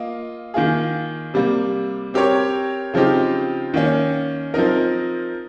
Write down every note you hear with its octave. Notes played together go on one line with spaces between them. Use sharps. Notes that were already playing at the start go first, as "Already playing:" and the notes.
Already playing: A#3 F4 D#5
D#3 A#3 F4 G#4
C3 G3 A#3
C4 G4 A#4 C#5
C#3 F3 C4 D#4 G4
D#3 A#3 C#4
F3 C4 D#4 A#4